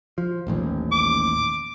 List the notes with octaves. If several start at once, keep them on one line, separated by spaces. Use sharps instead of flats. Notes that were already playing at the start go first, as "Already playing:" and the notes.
F3
D#1 A1 D#2
D6